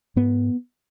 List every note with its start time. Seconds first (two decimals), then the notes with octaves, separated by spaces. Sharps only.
0.16 G#2 B3